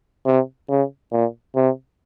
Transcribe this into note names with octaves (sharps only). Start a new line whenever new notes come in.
C3
C#3
A#2
C3